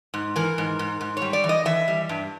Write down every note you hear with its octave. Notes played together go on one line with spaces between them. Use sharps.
G#2
E3 A#4
G#2
G#2
G#2
G3 C#5
D5
E3
D#5
E3 E5
G3
G2